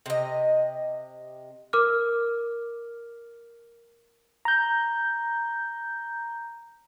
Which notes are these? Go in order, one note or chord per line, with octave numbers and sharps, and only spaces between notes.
C3 D#5
A#4 D6 F6
A#5 G6